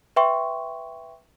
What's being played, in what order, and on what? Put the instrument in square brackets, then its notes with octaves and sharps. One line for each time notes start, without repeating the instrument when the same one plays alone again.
[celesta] B4 E5 G5 C6 C#6